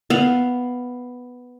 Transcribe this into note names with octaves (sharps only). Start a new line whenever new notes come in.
B3 F5